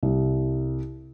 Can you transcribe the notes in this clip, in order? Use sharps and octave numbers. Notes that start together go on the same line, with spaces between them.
C2